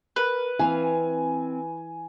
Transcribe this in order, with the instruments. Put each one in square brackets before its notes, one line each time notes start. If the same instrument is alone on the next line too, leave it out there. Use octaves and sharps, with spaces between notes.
[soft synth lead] A#4 [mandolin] B4
[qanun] E3 F5 [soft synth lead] C4 [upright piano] G#5